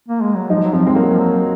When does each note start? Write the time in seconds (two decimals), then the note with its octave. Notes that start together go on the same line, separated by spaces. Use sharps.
0.08 A#3
0.22 G#3
0.36 F#3
0.49 F3 D#4
0.63 F#3
0.72 F3 C4
0.86 G#3 C4
0.95 F#3 A#3
1.12 F3
1.18 F#3